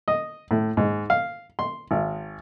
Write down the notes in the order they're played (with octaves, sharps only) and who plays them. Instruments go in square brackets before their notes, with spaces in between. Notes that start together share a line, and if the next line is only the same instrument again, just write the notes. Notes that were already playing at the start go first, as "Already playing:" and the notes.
[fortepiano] D#5
A2
G#2
F5
C6
G#1